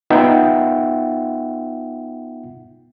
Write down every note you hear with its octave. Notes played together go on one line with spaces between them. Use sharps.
B3 D#4 F4 E5 F#5 G5